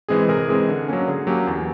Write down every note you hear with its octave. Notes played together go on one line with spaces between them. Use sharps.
E3 G#3 C4 G#4
C3 G#4 A#4
E3 G#3 C4
D3
F#3 A#3 C#4
D3 G#4
F#3 A#3 C#4 G4
E2